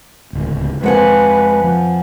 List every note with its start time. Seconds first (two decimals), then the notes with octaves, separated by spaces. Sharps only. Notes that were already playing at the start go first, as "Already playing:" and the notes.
0.33 D1 C#2
0.84 F2 G#3 B4 F#5 G#5
1.64 F3